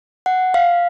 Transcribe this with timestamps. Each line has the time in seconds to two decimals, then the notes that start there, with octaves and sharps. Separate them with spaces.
0.26 F#5
0.54 F5